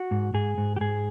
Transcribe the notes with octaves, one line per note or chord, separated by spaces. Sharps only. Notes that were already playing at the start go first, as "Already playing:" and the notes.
Already playing: F#4
G#2
G#2 G#4
G#2
G4
G#2 G#4